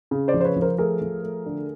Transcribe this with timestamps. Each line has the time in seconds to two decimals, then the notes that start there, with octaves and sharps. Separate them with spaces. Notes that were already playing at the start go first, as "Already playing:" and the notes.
0.11 C#3
0.28 C5 D5
0.34 F3
0.41 C5
0.45 B4 C#5
0.56 F3
0.62 A#4 C5
0.78 A3 G#4 A#4
1.01 F3
1.23 A3
1.46 D3